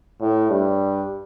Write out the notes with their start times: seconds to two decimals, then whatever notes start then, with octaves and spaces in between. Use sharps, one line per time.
0.22 A2
0.50 G2